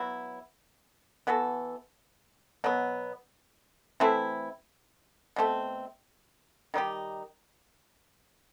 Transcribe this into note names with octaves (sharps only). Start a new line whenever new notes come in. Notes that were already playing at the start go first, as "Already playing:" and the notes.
Already playing: F#3 B3 E4
E3 B3 F#4 A4
B2 F#3 B3
E3 A3 C4 E4
B2 A3 C4
D#3 G3 D#4 G4